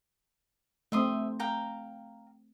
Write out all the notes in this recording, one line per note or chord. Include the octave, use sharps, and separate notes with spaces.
A3 C4 E5 C6 D#6
F5 G5 A#5